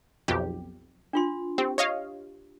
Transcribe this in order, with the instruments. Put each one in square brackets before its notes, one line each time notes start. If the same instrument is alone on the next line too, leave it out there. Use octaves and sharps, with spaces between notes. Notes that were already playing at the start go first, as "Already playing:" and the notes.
[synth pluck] B1 F2 G4
[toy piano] D4 F4 C6
[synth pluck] C4 [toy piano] G4
[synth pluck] C#5 D#5 F5